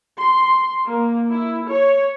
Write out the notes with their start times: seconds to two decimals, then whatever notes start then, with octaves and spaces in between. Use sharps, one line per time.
0.18 C6
0.86 A#3
1.31 E4
1.67 C#5